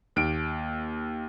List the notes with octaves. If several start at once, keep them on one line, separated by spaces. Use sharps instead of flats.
D#2 D7